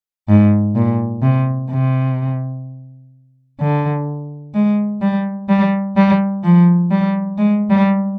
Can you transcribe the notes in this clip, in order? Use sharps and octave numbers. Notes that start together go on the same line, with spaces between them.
G#2
A#2
C3
C3
D3
G#3
G3
G3
G3
F3
G3
G#3
G3